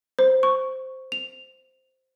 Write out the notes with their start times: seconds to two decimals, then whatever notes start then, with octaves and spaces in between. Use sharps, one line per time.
0.19 C5
0.43 C#6
1.12 F7